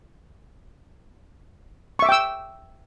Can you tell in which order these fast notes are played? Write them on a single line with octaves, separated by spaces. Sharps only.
C#6 E5 D6 G5 E6